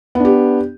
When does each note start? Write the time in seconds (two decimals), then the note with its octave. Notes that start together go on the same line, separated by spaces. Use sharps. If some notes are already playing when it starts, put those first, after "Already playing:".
0.15 B3
0.20 D4
0.25 G4